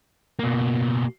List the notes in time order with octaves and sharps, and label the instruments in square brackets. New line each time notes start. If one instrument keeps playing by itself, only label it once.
[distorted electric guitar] B2 A#3